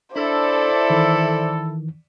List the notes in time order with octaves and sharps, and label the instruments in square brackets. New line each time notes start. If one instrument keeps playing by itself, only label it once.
[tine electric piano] D4 [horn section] E4 A4 [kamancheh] C5 D5
[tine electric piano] D#3 E3